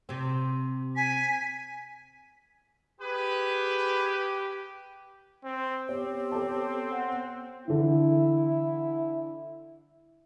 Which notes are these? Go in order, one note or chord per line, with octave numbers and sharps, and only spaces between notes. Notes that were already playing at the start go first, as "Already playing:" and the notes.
C3 C4
G#5 B6
G4 G#4 B4
C4
B3 C4 G4 C#5
A4 C#5 A5
F#5
D3 E3 E4